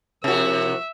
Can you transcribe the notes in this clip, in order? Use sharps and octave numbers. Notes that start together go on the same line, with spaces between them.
C3 F3 E4 F#4 A#4 E5